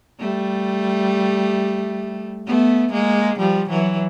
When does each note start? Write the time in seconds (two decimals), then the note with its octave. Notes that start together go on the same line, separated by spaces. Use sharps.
0.19 G3 A3
2.47 A3 B3
2.93 G#3 A#3
3.39 F3 G3
3.69 E3 F#3